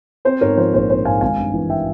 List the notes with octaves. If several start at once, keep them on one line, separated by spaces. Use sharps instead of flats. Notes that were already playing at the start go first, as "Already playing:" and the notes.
C4 C5
G#2 A#4 C#5
F3 C5
A#1 C5
C4 C5
G#2 F5 G#5
G#1 F5 G#5
G2
E3
E5 G5